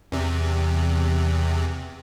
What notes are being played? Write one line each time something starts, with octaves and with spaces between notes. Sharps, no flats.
E2 C3